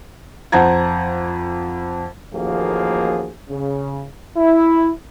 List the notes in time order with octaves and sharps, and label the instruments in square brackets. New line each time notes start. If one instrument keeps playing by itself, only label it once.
[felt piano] F2 C5 F#5 A5 A#5 G#6
[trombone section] A1 D#2 F3 A#3 F#4 G#4
C#3
E4